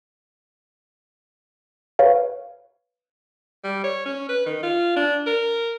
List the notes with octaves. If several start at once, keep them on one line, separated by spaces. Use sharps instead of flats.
B4 C#5 F5
G3
C#5
C#4
B4
D#3
F4
D4
A#4